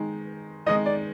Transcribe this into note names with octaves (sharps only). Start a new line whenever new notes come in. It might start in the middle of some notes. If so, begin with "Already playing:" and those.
Already playing: D#3 G#3 D#4
D#3 G#3 D#4 D#5
D5